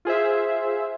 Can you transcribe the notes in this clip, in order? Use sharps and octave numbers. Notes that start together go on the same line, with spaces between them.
F4 G#4 C5 E5